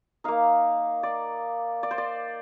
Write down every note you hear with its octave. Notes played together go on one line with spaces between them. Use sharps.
A#3 D#4 F5
D5
D5
C5
D5